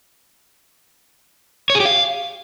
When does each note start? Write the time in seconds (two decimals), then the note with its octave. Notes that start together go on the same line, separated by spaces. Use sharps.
1.70 C#5
1.75 G#4
1.80 G4
1.85 F5